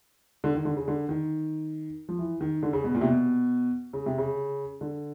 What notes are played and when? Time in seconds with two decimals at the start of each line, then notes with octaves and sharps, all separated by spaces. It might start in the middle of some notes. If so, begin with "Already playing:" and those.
0.44 D3
0.55 D#3
0.65 D3
0.77 C#3
0.88 D3
1.09 D#3
2.09 F3
2.19 E3
2.41 D#3
2.63 D3
2.73 C#3
2.84 B2
2.95 A#2
3.01 C3
3.05 B2
3.93 C#3
4.06 C3
4.18 C#3
4.81 D3